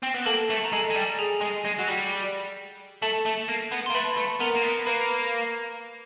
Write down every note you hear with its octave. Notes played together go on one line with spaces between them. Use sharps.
C4
B3
A#3 A4 A5
A3
A#5
G#3 A4 A5
G#3
G3
G#4 G#5
G#3
G#3
F#3
G3
A3 A4 A5
A3
A#3
B3
C6
A#3
A3 B4 B5
A3
B3 A#4 A#5
A#3
B3
A#3 B4 B5